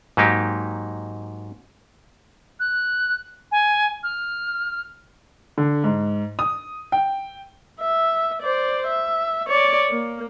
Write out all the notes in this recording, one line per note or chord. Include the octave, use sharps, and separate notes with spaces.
G#2 F#3 A#3 D#4 G4
F#6
G#5
F6
D3
G#2
D#6
G5
E5
C5 D5
E5
C#5 D5
A#3